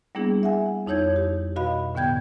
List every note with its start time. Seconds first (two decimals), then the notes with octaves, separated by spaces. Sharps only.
0.15 G3 A#3 B3 D4 E4 G#4
0.43 E5 F#5 G#5
0.87 F2 D#4 E4 C#5 G6 G#6
1.16 G4
1.56 B2 F#4 D#5 F5 B5
1.94 A2 D3 B3 G5 G6 G#6